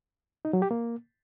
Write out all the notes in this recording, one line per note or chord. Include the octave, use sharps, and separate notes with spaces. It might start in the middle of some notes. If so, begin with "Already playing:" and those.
D#4
F#3
G4
A#3